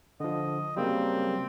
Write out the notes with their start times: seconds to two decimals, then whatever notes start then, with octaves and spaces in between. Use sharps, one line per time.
0.20 D3 F3 D#5
0.77 C#3 F#3 G3 A#3 C4